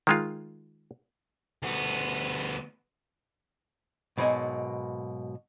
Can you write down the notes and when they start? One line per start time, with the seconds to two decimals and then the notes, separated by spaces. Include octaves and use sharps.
0.07 D#3 G#3 F4
1.62 D2 B3
4.18 G#2 B2 F#3 A#3 D#5 G#5